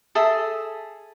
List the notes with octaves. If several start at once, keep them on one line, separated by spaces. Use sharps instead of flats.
G#4 A4 E5 D#6